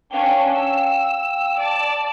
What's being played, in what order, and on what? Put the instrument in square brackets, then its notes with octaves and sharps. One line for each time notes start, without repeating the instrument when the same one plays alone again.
[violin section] C#4 D4 [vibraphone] F5 G5
[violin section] E6
D5 A5